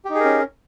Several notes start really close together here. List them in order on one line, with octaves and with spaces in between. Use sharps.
G4 D#4 G#4 A#4 C#4